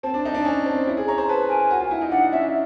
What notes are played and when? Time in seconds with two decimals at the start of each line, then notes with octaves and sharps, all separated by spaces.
0.03 C4 A5
0.14 D4
0.25 D#4
0.35 D4
0.45 C#4
0.66 C4
0.87 E4
0.97 G#4
1.08 C#5 A#5
1.18 C5
1.28 B4 A5
1.49 A#4 G#5
1.71 F#4
1.80 F4
1.91 E4
2.01 D#4
2.11 D4 F#5
2.32 C#4 E5